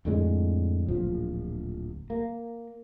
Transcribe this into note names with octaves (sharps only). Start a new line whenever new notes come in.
F2 A2 D3 G#3
D1 A#1 F3
A#3